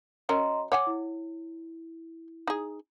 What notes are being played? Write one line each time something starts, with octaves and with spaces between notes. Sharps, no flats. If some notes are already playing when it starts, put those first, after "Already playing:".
F#3 C#4 A#4 D#5 A#5 C6
C#5 F#5 G#5 D6
E4
D#4 G#4